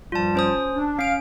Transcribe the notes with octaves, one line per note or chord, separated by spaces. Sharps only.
G2 F3 G3 F4 A5
C#4 C5 D#6
D4
C#4 F5 D7